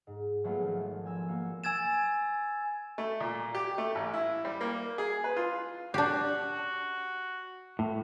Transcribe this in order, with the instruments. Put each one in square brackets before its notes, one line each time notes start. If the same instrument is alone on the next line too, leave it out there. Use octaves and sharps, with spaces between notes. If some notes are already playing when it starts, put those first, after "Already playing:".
[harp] G#2
F#3 G#3 A3 B3 F4 B4
G#1 F3
G#5 A#5 E6
A#3 F#4
[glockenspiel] G#5 E6 G#6 A6 E7
[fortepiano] A3
A#2
G4
A3
A1
E4
G3
A#3
G#4
B4
F4
[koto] D4 G4 [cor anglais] F#4
[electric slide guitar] A2